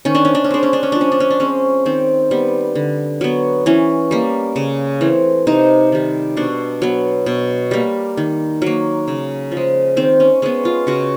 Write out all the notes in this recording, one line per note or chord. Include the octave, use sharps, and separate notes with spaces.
D#3 C#4
D4
C#4
D4
C#4
G#3 C4 D4
C#4
D4
C#4
F3 D4
C#4
D4
C#4
D4
G#3 C4 C#4
D#3 C4
G3 B3
D3
F#3 B3
E3 C#4
G3 A#3
C#3
E3 A3 C4
C3 D#4
D#3 G3
B2 D4
F#3 B3
B2
G3 A#3
D#3
F#3 A#3
C#3
F3
G#3
D#3 C4
C#4
G#3 B3 C#4
F4
C#3 F#4